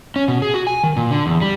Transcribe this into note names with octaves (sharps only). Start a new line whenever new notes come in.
C#4
B2
G#4
F#4
G#5
D#3
A#2
D3
E2
G3